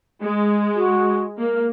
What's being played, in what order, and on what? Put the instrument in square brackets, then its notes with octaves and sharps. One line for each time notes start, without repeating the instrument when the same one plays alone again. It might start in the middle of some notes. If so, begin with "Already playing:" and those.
[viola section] G#3
[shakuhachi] F#4
[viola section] A#3 [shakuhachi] A#4